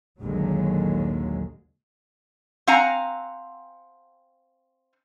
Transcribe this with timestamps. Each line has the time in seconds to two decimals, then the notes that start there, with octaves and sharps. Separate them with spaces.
0.21 A#1 D#2 D3 F#3 G#3
2.67 C4 F5 F#5 G#5 A#5